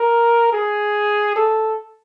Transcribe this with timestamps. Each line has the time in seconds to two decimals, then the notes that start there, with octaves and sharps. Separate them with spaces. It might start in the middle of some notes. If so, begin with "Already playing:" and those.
Already playing: A#4
0.53 G#4
1.36 A4